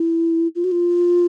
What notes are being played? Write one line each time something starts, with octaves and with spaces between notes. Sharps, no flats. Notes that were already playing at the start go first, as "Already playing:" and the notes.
Already playing: E4
F4
F#4
F4